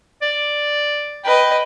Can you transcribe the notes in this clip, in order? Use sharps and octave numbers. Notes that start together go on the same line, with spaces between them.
D5
B4 D#5 G5